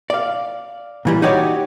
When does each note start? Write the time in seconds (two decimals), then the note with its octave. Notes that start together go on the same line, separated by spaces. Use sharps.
0.10 D5 F5
1.05 A#2 E3 G3
1.22 D#4 F#4 G4 C#5 D5